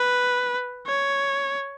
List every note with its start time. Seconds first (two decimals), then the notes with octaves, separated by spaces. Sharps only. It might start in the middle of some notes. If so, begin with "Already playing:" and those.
Already playing: B4
0.86 C#5